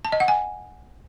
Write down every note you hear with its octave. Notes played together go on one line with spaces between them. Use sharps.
A5
D#5
F#5
G#5